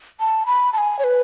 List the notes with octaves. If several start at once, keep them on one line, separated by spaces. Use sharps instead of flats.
A5
B5
A5
G#5
C#5
B4